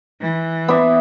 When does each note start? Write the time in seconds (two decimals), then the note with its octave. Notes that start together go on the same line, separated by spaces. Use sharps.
0.21 E3
0.68 B3 D5 E5